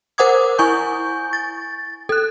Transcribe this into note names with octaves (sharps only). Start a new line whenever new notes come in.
A#4 C5 F#5 D6 D#6 G#6
E4 G#5 C#6 G6
A6
A4 F#6